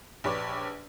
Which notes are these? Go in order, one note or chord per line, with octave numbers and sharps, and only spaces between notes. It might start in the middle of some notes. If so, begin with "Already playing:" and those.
A#1 G4 B4 C#5 D5 D6